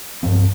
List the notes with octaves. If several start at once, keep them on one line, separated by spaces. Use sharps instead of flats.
G2 F3 C4